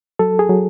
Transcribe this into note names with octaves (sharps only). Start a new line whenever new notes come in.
F#3 A4
G#4
F#3